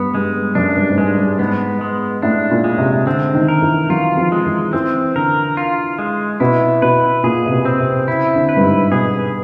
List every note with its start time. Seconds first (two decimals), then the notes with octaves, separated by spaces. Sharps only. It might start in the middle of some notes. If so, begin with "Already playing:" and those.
Already playing: G2 B3
0.14 G2 G#3
0.55 F#2 D4
0.76 G2
0.90 G#2
0.98 G2 G#3
1.18 G2
1.39 G#2 B3
1.81 G#3
2.22 A2 D4
2.51 A#2
2.64 G#3
2.78 C3
3.06 D3 C4
3.34 D#3
3.48 A#4
3.62 E3
3.90 F#3 F4
4.17 F3
4.32 G#3
4.46 E3
4.73 E3 C4
5.15 D3 A#4
5.57 F4
5.99 G#3
6.40 B2 E4
6.82 B2 B4
7.23 A#2 G#4
7.46 C3
7.51 B2
7.65 C4
7.80 C3
8.08 C#3 E4
8.35 D3
8.49 B4
8.57 G2
8.63 G#2
8.91 B2 G#4